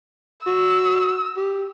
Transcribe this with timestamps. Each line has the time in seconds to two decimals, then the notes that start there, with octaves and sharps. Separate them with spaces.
0.46 F#4 E6
1.37 G4